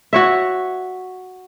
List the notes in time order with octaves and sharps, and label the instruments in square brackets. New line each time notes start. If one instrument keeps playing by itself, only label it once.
[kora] F#4 C#5 E5